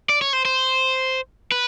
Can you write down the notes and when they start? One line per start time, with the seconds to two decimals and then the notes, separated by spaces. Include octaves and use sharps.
0.09 D5
0.21 C#5
0.33 C5
0.45 C5
1.52 B4